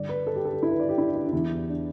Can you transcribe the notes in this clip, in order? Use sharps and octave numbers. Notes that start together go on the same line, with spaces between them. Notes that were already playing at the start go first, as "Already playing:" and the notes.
Already playing: G2 D3 D5
B4
A4
G4
A4
G4
E4
B4
D5
G4
E4
D4
E4
D4
E2 E3 E4
D4